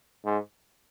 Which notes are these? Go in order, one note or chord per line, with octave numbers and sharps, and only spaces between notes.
G#2